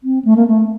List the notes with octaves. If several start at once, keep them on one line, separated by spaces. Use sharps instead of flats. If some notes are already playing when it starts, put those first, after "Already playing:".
C4
A3
A#3
A3